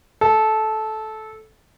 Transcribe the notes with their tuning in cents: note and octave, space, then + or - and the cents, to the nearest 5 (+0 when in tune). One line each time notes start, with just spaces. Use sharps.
A4 -15